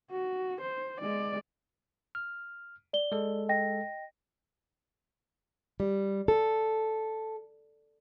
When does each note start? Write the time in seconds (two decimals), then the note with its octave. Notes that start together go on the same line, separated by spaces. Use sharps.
0.11 F#4
0.61 C5
1.01 G#3 D5
2.15 F6
2.93 D5 G7
3.12 G#3 A4
3.49 D#5 G5 A#6
5.80 G3
6.28 A4